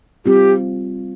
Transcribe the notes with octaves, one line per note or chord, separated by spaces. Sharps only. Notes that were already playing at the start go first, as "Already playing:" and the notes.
G3 C4 F4 G4